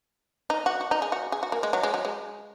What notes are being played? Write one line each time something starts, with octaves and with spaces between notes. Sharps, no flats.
D#4
F#4
F#4
D#4
G#4
F#4
G#4
F#4
A#3
G#3
F#3
G#3
F#3
G#3